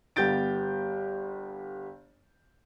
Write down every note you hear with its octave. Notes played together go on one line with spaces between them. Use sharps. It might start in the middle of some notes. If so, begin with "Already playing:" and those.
G1 B3 G4 G6 A6 D7